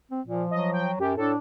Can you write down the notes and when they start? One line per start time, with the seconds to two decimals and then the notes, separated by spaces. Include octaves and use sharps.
0.11 C4
0.27 A#2 F3
0.51 F#3 D#5
0.74 G5
1.00 F#2 G4
1.17 A2 D4 A4